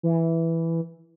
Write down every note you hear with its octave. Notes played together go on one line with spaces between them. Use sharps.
E3